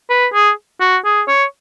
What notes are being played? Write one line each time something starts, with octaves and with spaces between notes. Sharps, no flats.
B4
G#4
F#4
G#4
C#5